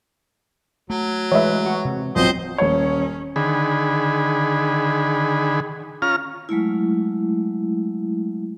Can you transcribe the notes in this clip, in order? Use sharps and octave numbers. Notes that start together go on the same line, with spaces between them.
F#3 A3
E3 G#3 B4 C#5 D#5 E5
F#4 C#7
C3
D#1 G#1 F3 F#3 B3 C4 C5 D#5
D#1 C#4 C#5
D3 D#3 G#4 B5
C#4 F4 A#5 F6
F#3 G#3 A3 E4